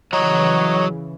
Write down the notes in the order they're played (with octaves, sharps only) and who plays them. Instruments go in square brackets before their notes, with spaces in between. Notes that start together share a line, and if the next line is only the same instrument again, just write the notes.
[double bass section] C#3 E3 [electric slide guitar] F#3 A#5 [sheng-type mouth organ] C#5 D#5